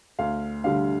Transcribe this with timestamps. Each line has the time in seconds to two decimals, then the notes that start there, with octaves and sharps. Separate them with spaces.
0.19 D2 F5
0.64 D3 G3 D4 F5